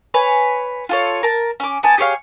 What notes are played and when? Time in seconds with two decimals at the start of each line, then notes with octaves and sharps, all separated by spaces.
0.14 B4 C#5 G#5
0.89 F4 A4 C#5
1.23 A#4 A5
1.60 C#4 D6
1.83 B3 G#5 A5
1.98 G4 G#4 C#5 F5